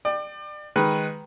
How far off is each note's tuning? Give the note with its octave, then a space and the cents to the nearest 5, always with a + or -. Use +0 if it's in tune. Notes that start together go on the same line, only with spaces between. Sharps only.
D5 +30 G5 +0
D#3 +0 G#3 +0 B4 +0